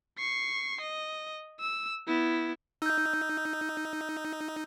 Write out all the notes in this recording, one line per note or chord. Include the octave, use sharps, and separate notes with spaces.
C#6 C7
D#5
E6
B3 E4
D#4 E6 G6